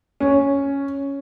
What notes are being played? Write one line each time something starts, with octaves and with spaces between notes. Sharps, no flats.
C#4